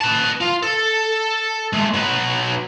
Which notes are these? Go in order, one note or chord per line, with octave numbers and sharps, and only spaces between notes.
B4 A5
F4
A4
G#3 A3
F#3 B4